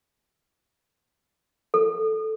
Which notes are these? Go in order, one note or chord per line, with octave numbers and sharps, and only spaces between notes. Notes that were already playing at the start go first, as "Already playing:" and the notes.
A4